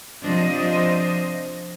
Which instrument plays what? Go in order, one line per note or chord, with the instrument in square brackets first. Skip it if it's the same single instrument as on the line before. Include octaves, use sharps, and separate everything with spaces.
[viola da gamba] C3 C4 D4 [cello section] F3 C5 D#5